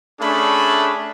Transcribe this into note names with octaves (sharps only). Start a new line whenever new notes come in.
A3 C#4 D4 G#4 B5